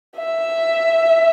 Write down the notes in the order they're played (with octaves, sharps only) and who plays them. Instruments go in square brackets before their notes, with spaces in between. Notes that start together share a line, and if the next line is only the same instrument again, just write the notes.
[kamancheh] E5